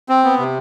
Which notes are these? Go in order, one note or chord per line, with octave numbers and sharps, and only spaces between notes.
C4
B3
C3